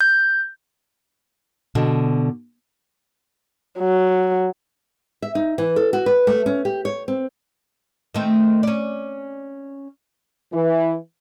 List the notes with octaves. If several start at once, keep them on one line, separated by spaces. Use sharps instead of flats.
G6
B2 D3
F#3
E5
D#4
E3
A4
F#4
B4
A3
C#4
G4
C#5
C4
D#3 A3 C4
C#4 D5
E3